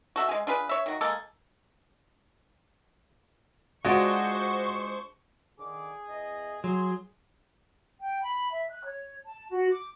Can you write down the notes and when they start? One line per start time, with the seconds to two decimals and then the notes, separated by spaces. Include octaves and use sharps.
0.16 F#4 A4 E5
0.29 G#3 G#4
0.47 D4 F4 G#4 B4
0.69 C#5 E5
0.86 D#3 F#4
1.01 G#3 A#3 G#4 A4
3.85 G#3 D4 F4 F#4 C5 C#6
5.60 D3 D#3 G#4 D6
6.09 E2 D#5
6.64 F#3 G#4 C6
8.01 G5
8.22 B5
8.52 E5
8.70 F#6
8.84 C#5
9.25 A5
9.51 F#4
9.70 D6